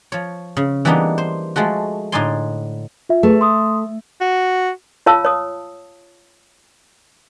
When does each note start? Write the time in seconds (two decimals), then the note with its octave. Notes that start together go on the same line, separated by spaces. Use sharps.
0.12 F3 C#5
0.57 C#3
0.85 E3 G3 A#3 B3 D4 D#4
1.18 C5
1.56 F3 G#3 A3 F#4
2.12 A2 D3 D#4 D5 G#5 C6
3.09 F4 E5
3.23 A3 G#4 B4
3.41 C6 D#6
4.21 F#4
5.06 F4 C#5 F5 A5 E6
5.25 C#5 D#6